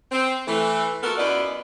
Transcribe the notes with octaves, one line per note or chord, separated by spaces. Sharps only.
C4
E3 A3
A3 B3 F4 F#4 A4 A#4
F#2 B3 E4 F4 D5 D#5